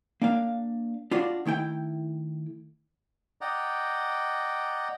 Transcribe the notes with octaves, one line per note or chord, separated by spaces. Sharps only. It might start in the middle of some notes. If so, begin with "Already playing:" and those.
A#3 D4 F5
D4 F4 F#4 D5
D#3 A3 E4 G5
D5 D#5 F#5 G5 A#5